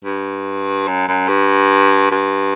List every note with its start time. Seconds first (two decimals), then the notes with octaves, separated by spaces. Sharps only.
0.05 G2
0.87 F#2
1.08 F#2
1.28 G2
2.11 G2